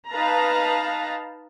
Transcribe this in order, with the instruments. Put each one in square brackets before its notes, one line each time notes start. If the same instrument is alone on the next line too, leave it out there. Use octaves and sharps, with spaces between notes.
[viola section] D#4 B4 F5 A5 A#5